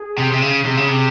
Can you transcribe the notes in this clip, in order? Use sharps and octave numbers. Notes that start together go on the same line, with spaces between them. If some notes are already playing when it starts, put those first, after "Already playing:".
Already playing: G#4
C3
C3
C#3
C3 G#4
C#3
C3